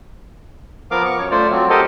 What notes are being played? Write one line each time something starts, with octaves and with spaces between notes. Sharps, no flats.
F3 B3 A#4 F5 D6
C#6
F#2 C#5
A3 F4 C5 D5
F#3 C4
G4 A4 A#4 C5 D#5